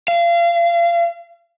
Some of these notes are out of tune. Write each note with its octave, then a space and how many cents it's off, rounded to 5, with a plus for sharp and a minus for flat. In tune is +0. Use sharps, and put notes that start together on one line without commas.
F5 -30